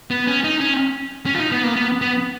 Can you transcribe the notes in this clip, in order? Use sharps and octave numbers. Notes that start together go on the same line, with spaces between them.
B3
C#4
D#4
C#4
C#4
F4
D#4
B3
A#3
B3
B3